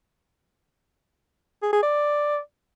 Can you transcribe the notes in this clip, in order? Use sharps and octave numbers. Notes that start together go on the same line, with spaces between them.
G#4
G#4
D5